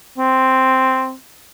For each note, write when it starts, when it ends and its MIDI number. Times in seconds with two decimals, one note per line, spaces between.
0.18 1.14 60